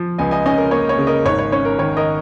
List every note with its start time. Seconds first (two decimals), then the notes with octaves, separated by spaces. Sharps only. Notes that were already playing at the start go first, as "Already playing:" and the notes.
Already playing: F3
0.18 C#2 D#5 G#5
0.31 D#5 G#5
0.46 C#4 D#5 G#5
0.58 A#4
0.71 A#3 C#5
0.89 C#5
0.98 C#3
1.07 A#4 D#5
1.25 G#1 C#5
1.39 C#5
1.52 C#4 C#5
1.65 A#4
1.79 D#3 C#5
1.97 A#4 D#5